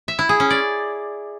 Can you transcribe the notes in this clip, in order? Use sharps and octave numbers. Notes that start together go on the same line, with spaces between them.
E5
E4
G#4
C#4
D5